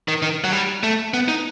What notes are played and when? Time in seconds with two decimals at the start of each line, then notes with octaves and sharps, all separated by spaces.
0.08 D#3
0.22 D#3
0.44 F#3
0.52 G3
0.83 A3
1.14 B3
1.28 D#4